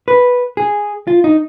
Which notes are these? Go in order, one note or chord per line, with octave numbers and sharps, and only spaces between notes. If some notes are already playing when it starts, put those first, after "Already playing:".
B4
G#4
F4
D#4